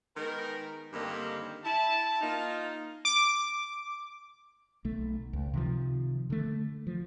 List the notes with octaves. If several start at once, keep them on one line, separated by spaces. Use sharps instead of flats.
D#3 G#3 B3 A#4
G2 D3 D#3 A#3 C4 G4
E4 A5
A#3 D#4 F4
D6
B1 A3
C#2
C3 D#3 F3
D3 A3
F3